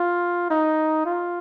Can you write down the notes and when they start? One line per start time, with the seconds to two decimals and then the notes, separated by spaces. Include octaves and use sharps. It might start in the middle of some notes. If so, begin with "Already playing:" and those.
Already playing: F4
0.50 D#4
1.06 F4